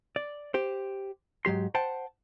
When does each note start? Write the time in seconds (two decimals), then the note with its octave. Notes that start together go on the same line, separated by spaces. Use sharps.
0.16 D5
0.54 G4 C5
1.45 G#2 F#3 G4 C6
1.75 C5 F#5 G5 A5